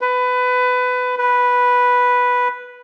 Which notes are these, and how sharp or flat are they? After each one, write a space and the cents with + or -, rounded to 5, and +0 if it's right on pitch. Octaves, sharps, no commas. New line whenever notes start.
B4 +20
B4 -5